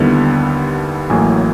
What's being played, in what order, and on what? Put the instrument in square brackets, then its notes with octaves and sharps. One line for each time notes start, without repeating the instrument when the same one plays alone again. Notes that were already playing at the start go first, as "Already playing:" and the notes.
Already playing: [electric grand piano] D#2 D3 G3 B3 E4
A1 A2 F#3 A#3 G#5